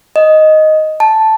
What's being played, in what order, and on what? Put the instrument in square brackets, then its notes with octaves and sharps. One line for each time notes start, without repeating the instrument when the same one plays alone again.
[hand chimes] D#5
A5